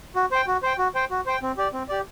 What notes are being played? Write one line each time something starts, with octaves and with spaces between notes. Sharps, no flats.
F#4
C5 G5
F#4
C5 G5
F#4
C5 G5
F#4
C5 G5
C4
G4 D5
C4
G4 D5